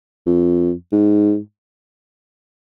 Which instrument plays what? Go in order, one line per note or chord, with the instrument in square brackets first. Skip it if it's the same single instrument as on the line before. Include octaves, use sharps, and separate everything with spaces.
[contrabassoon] F2
G#2